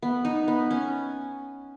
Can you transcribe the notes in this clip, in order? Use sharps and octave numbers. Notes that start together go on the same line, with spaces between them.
B3
D#4
B3
C#4